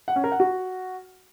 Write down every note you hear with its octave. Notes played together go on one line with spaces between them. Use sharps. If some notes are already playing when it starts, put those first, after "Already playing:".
F#5
C#4
A#4
F#5
F#4